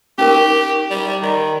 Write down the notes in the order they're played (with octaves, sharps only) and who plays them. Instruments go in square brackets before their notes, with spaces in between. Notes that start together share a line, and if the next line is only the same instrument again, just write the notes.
[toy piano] C#4 D#4 A#4 [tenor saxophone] G4
[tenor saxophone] G3
D#3